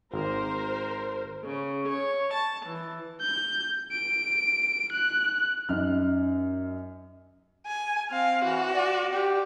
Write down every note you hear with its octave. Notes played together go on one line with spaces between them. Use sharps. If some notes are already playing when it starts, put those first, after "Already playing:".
G#1 A#4 C5
C#3
C#5
A5
E3
G6
D7
F#6
F#2 D#4 F6
G#5
C4 F5
E3 F#4
D5
G4